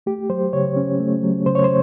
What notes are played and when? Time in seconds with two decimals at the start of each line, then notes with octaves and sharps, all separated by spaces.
0.06 A3 G4
0.29 F#3 C5
0.53 C#3 C#5
0.76 C#4
1.00 A3
1.23 F#3
1.46 C#3 C5
1.55 C#5
1.64 C5